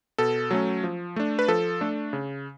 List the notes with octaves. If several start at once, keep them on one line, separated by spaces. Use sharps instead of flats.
B2 A4
F#3 A3 C#4
F3
A3 D4
B4
F3 A4
A3 D4
C#3